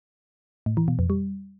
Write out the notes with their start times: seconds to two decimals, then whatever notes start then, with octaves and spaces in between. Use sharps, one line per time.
0.66 A2
0.77 E3
0.88 B2
0.99 F2
1.10 G3